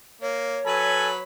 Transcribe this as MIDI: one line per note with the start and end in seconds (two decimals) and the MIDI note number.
0.21 0.59 58
0.21 1.22 73
0.66 1.21 54
0.66 1.09 69
0.66 1.21 71
0.66 1.09 80
0.66 1.21 83